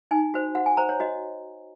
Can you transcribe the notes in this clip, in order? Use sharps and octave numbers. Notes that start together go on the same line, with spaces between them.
D#4 G#5
F#4 C5
F#4 F#5
G#5
C5 A#5
C#5
F#4 D#5